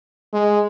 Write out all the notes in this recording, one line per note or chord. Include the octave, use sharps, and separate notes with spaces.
G#3